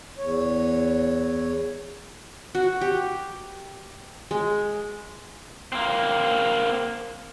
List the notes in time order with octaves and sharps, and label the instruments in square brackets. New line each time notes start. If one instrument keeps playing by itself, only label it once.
[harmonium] E2 C#5
[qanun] F#4
G4
G#3
[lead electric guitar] A#3 C4